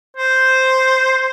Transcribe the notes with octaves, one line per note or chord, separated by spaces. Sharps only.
C5